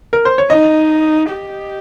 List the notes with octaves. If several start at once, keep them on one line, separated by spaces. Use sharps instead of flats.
A#4
C5
C#5
D#4 D#5
G4